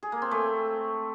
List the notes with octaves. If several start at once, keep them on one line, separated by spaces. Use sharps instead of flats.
G#4
A#3
C4
A3